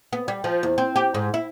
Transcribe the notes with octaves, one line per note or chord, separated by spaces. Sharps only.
B3
G3
F3
E2
C4
G4
G#2
E4